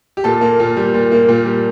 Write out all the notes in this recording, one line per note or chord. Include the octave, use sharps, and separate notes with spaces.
G4
A#2 A4
A#3
A#2
G3
A#2
A#3
A#2
G3